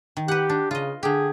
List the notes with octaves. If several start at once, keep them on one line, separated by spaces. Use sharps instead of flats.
D#3
G4 B4 F#5
D4
C#3 F4 D#5
D3 G4 G#4